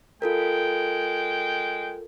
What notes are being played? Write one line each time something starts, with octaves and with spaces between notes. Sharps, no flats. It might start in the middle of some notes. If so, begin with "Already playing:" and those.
G#3 F4 A4 A#4 G5